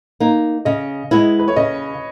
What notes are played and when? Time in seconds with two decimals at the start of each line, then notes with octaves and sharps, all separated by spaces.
0.20 A#3 D#4
0.65 C#3 D#5
1.11 G#3 B3 E4
1.39 B4
1.48 C#5
1.56 C#3 D#5